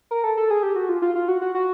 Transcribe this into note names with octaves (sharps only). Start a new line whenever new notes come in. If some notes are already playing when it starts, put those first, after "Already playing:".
A#4
A4
A4
G#4
G4
F#4
F4
F4
F4
F#4
F#4
F#4